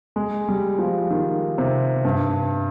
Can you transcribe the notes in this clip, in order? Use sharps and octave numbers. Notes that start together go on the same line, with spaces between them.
G#3
G3
F3
D#3
C3
G2